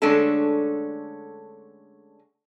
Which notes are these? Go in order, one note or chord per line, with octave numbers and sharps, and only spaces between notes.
D3 G#3 A3 C#4 D4 A4